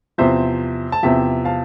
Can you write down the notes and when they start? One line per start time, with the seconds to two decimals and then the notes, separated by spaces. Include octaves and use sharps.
0.18 E2 C3 F3 C5 E5
0.92 A5
1.03 E2 C3 F3 E5 G5
1.45 F5 A5